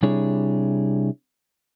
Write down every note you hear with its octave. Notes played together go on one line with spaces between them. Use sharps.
C3 G3 D4 E4 G#4 C#5